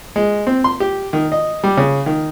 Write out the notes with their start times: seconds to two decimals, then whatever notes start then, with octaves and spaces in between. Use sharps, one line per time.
0.16 G#3
0.47 C4
0.64 C6
0.80 G4
1.13 D#3
1.32 D#5
1.64 G3
1.77 C#3
2.06 D#3